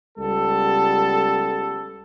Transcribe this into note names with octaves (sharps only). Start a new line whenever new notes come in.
C#2 G3 B3 A4